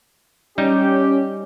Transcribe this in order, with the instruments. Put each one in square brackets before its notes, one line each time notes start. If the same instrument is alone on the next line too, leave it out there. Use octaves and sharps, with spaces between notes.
[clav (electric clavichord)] G3 D#4 [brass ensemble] C#4 G4